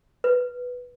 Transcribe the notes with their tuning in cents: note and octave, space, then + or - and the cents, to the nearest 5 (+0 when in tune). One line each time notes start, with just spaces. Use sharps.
B4 -5